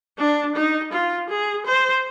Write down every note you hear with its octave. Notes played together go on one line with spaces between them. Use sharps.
D4
D#4
F4
G#4
C5